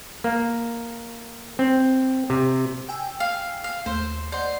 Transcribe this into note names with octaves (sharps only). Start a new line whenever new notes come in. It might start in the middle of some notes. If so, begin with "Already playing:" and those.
A#3
C4
C3
G5 G#5 E6
F5
F5
D#2 A3 C5 E7
C5 D5 D#5 F#5